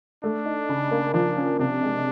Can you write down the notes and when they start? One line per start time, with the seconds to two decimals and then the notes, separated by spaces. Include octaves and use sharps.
0.23 A3 D4
0.46 D#4
0.69 C#3
0.91 A#3
1.14 F3 D4
1.37 C#4
1.59 C3 D4
1.82 G#3